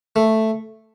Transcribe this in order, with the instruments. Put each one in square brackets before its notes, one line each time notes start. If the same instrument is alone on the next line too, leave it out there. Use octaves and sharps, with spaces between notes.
[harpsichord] A3